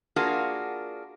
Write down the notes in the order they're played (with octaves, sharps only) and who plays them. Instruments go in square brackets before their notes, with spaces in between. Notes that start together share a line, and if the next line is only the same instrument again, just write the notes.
[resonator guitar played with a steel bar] A#3 D4 F4 F#4 G#4 A#4